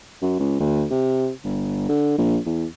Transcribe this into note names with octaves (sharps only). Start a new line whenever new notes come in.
F#2
C#2
D2
C3
G1
D3
A#1
E2